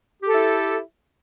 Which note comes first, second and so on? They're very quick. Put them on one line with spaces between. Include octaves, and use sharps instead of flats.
G4 A4 E4